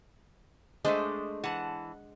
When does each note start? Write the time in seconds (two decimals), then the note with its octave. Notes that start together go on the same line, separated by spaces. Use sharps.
0.85 G#3 A3 D4 C5 D#5
1.44 E3 F#5 A5